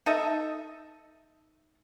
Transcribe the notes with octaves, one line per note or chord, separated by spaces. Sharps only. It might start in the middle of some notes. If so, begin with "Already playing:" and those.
D#4 A4 D#5 E5